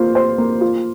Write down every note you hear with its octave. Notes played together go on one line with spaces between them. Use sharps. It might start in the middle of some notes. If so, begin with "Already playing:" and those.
Already playing: A#3 F4 C5
C5
A#3
F4